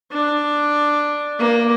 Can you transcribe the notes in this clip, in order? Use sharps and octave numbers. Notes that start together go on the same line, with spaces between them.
D4
A#3